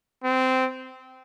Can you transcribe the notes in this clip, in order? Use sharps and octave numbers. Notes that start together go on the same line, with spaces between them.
C4